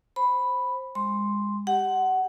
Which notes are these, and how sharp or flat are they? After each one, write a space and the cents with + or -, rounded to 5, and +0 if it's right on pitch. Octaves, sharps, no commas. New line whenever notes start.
C5 +15 B5 +0
G#3 -30 C6 +0
G4 +0 F#5 +15